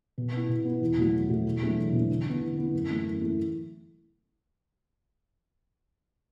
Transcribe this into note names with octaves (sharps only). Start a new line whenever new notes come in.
B2
B3 E4
B2
B3 E4
E2
B2 F#3 A3 F#4
E2
B2 F#3 A3 F#4
E2
B2 F#3 A3 D4
E2
B2 F#3 A3 D4
D3
B3 E4
D3
B3 E4
F#2
E3 A3 E4
F#2
E3 A3 E4